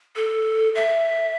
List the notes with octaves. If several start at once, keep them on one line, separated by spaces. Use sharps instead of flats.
A4
E5